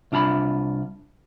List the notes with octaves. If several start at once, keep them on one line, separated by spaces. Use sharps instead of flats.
C2 D4 F4 A#5 B5